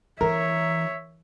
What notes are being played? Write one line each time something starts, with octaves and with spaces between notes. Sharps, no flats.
E3 A#4 C#5 E5